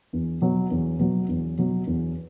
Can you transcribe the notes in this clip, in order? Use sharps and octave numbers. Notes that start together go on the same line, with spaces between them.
E2
B2 F#3
E2
B2 F#3
E2
B2 F#3
E2